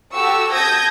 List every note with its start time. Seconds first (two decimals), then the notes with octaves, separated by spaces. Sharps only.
0.12 F#4 G4 A4 C#6 E6
0.51 A5 D#6 G6 G#6 A#6